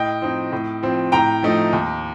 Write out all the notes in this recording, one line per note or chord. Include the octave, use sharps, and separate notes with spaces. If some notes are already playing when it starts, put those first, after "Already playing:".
Already playing: A2 D#5 G5
F3 C4 D#4
A2
F3 C4
A2 G5 A#5
F3 A3 D#4
D#2